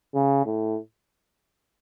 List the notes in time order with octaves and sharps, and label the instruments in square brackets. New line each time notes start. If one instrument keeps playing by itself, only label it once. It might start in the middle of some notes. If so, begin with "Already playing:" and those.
[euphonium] C#3
A2